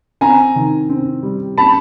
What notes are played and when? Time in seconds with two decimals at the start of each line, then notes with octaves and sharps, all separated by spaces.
0.21 C4 G#5 A#5
0.56 D#3
0.89 C4
1.23 G3
1.57 C#4 A5 B5